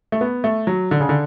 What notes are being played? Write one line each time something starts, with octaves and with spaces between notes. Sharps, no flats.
A3
B3
A3
F#3
D3
C#3
D3